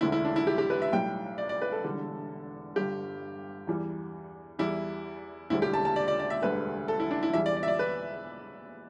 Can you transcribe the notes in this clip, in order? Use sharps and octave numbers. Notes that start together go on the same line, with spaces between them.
E1 D2 D3 E4
E4
D4
E4
G4
G4
B4
E5
B1 A2 G3 G5
D5
D5
B4
A4
E1 E2 D3 G3
G1 G2 D3 G4
E2 E3 G3
E2 E3 G3 E4
E1 D2 D3 G3 E4
G4
A5
A5
D5
D5
D5
E5
E1 D2 D3 G3 B4
A4
E4
D4
E4
E2 E3 G3 E5
D5
D5
E5
D5
B4